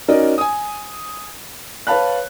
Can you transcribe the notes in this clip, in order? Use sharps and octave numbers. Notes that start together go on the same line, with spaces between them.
C#4 D#4 F#4 A#4 D5 D#5
G#5 D#6
B4 C#5 F5 A5 B5 F#6